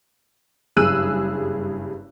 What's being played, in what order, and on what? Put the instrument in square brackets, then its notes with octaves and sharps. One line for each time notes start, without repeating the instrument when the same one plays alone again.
[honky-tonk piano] F#1 G2 G#4 E6 F#6 D#7